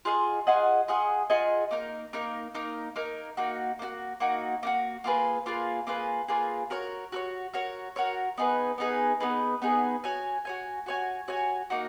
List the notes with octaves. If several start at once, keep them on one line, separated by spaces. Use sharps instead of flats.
F4 G#4 D#5 F#5
F4 G#4 D#5 F#5
F4 G#4 D#5 F#5
F4 G#4 D#5 F#5
A#3 D#4 A#4
A#3 D#4 A#4
A#3 D#4 A#4
A#3 D#4 A#4
A#3 D#4 F#4
A#3 D#4 F#4
A#3 D#4 F#4
A#3 D#4 F#4
A#3 F4 G#4 B4
A#3 F4 G#4 B4
A#3 F4 G#4 B4
A#3 F4 G#4 B4
F#4 A#4 C#5
F#4 A#4 C#5
F#4 A#4 C#5
F#4 A#4 C#5
B3 D#4 G#4 B4
B3 D#4 G#4 B4
B3 D#4 G#4 B4
B3 D#4 G#4 B4
F#4 C#5 G#5
F#4 C#5 G#5
F#4 C#5 G#5
F#4 C#5 G#5
A#3 D#4 F#4